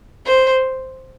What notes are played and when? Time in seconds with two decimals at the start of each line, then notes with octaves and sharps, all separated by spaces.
0.25 C5